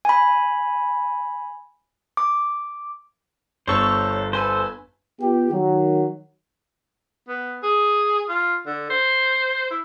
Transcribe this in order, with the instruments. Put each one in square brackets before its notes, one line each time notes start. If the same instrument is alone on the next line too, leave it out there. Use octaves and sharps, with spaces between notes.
[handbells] G#5 B5
D6
[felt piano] G1 [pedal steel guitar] A4 C5 [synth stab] C#5 C#6 E6
[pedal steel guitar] A4 C5 [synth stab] B4 G#5
[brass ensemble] B3 F4 G4
D#3 F#3
[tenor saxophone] B3
G#4
F4
D3
C5
E4